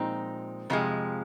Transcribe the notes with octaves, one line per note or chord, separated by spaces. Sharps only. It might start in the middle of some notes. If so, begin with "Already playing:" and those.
Already playing: A#2 F3 G#3 C4 D#4
F2 C3 F3 G#3